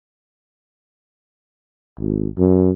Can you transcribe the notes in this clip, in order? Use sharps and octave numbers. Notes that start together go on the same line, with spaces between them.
G#1
F#2